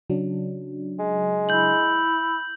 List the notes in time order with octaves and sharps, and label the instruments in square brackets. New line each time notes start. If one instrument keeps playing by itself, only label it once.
[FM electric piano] C#3 F#3 D4
[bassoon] G#3
[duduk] E4 [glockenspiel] G6 F#7